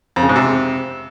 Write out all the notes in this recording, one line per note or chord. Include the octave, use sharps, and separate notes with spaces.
F2
C#3
G#2
C3